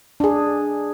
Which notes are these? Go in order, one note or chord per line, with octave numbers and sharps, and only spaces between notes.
D4 G#4